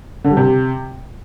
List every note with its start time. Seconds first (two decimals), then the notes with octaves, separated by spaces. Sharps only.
0.25 D3
0.31 G3
0.37 C3